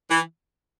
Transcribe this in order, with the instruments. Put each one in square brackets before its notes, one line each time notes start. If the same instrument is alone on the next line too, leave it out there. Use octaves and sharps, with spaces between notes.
[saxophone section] E3